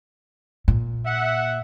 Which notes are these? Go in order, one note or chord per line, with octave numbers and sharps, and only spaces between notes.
A#2
E5 F#5